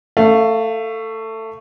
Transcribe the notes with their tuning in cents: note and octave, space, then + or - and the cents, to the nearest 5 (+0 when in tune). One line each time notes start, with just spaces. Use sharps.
A3 +20 F5 +0